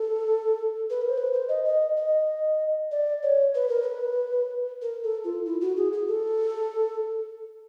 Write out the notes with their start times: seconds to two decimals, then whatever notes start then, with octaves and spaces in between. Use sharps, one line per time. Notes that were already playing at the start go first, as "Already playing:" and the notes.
Already playing: A4
0.90 B4
1.01 A#4
1.09 C5
1.18 B4
1.33 C5
1.49 D#5
1.65 D#5
1.97 D#5
2.91 D5
3.23 C#5
3.55 B4
3.69 A#4
3.82 B4
4.82 A#4
5.03 A4
5.24 F4
5.46 E4
5.61 F#4
5.77 G#4
5.93 G#4
6.08 A4